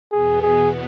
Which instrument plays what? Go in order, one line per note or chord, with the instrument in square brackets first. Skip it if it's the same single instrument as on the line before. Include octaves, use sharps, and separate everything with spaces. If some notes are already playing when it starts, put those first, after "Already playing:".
[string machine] E2 B2 B3 [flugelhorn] G#4
[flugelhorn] G#4